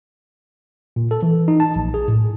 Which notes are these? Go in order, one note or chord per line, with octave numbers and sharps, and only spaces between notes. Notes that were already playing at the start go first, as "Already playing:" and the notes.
A#2
A4
E3
D#4
A5
A#1
G#4
A2